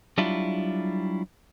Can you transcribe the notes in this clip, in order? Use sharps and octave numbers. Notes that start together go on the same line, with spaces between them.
F#3 G3 D4 E4 F4